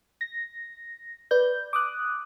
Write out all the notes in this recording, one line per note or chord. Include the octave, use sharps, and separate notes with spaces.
A#6
B4 D5 G6
D6 D#6 F#6